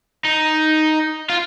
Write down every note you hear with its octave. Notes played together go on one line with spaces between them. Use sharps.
D#4
F4